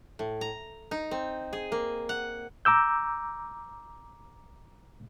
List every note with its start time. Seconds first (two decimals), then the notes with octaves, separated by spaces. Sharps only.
0.19 A2
0.41 A#5
0.91 D#4
1.11 C4
1.53 G#4
1.72 A#3
2.09 F#5
2.65 A#5 D6 E6 G6